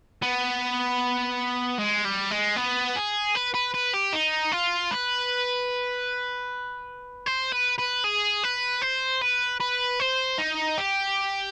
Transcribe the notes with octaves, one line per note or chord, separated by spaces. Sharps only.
B3
G#3
G3
G#3
B3
G#4
B4
B4
B4
G4
D#4
F4
B4
C5
B4
B4
G#4
B4
C5
B4
B4
C5
D#4
G4